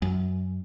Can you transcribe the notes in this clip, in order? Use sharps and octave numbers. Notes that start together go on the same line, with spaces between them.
F#2